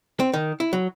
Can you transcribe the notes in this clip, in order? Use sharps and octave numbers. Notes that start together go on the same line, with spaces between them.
C4
D#3
E4
F#3